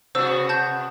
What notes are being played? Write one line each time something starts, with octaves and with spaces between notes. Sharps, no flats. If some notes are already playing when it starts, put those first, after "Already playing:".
C3 B3 F#4 C5 E6
A5 G6